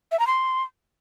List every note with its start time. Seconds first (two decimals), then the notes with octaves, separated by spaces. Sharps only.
0.12 E5
0.19 A#5
0.27 C6